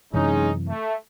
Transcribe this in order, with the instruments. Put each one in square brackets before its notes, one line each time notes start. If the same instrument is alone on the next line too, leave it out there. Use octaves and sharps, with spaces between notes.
[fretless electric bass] F#2 C3 E3 [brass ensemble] G#3 C#4 D#4
[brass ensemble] A3